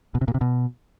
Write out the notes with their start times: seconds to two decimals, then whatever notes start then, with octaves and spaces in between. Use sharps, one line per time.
0.15 B2
0.21 C3
0.28 A#2
0.34 C3
0.41 B2